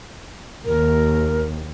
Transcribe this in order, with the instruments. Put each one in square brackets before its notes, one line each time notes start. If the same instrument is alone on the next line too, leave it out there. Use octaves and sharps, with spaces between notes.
[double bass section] D#2 [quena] A#4